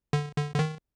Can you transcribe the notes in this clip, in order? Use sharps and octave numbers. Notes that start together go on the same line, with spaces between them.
D3
D3
D3
D#3